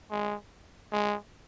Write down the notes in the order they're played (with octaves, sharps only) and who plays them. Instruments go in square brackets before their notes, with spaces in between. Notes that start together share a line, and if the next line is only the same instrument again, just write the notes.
[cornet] G#3
G#3